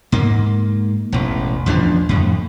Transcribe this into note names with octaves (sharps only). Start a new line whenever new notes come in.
G#2 A#3
E1 A1
A1 E2 F3 D4
F2 A2